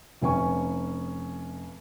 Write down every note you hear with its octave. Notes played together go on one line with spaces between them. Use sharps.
F1 C#4 G#5 C#6